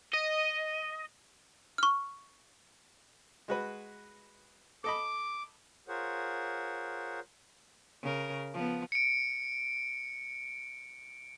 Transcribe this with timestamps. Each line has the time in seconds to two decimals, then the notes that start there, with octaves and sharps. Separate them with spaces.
0.13 D#5
1.78 C#6 F6
3.48 G#3 F#4 B4
4.84 A4 D#5 B5 D6
5.88 F4 G#4 A#4 C5 C#5 F#5
8.02 C#3 A#4
8.53 F3 B3
8.92 C#7 D7